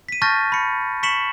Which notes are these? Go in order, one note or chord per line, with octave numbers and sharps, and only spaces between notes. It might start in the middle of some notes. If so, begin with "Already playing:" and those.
B6 D#7
A5 C#6 F6 G6 A6 A#6
B5 C#7
C#6 B6 C#7 E7 F#7